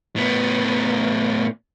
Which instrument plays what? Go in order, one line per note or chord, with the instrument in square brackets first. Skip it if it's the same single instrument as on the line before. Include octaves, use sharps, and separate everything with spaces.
[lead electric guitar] A2 B3